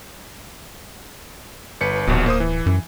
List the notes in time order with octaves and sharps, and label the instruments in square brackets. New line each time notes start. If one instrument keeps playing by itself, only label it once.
[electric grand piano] G1 B4 C#7
[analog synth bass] D1 [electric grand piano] A#1 D#2 B2
[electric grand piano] A#3 C5 D#6
E3
[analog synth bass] F#2